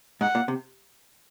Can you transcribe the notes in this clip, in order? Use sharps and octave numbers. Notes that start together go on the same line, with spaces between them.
G#2 F#5
A#2
C3